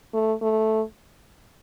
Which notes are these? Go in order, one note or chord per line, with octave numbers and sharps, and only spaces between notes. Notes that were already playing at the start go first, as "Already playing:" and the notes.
A3
A3